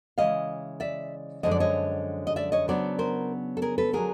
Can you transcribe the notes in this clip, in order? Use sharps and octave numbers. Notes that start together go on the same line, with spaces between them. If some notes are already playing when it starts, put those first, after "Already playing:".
C#3 E3 G#3 D#5 F5
D5 E5
F#2 D3 F3 G#3 D#5
D5
C#5 D#5
D#5
D5 E5
C#5 D#5
C#3 F#3 B3 D4 C5 D5
A#4 C5
A4
G#4 A#4
A4 B4
D3 F#3 G#4 A#4